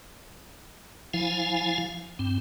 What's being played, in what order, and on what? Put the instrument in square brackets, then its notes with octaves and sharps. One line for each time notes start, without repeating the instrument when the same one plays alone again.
[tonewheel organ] F3 E4 F5 G#5
G2 C4